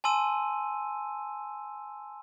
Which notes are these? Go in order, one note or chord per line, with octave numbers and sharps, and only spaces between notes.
G#5 A5 C6 E6 D#7